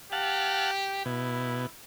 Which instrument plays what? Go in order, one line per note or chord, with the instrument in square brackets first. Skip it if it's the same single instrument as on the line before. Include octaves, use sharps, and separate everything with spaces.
[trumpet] G4 [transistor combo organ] F5 F#5 A5
[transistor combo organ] B2 [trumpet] E4